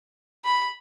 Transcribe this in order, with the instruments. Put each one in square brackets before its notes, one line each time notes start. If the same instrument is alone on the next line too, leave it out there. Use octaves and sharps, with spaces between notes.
[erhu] B5